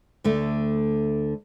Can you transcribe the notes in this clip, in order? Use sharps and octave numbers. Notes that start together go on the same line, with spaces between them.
D2 D3 A3